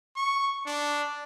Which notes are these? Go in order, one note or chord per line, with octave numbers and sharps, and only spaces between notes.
C#6
D4